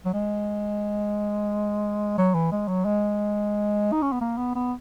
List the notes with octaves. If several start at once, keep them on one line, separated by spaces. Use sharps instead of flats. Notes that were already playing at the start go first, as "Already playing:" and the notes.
F#3
G#3
F#3
E3
G#3
F#3
G#3
D#4
C#4
B3
A#3
B3
B3